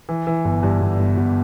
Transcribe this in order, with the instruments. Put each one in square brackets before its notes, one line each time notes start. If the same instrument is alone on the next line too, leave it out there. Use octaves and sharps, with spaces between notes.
[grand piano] E3
E3
G1
G2
G1
G1
G1